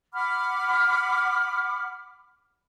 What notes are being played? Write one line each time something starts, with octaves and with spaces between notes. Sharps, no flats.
F#5 B5 D6 F6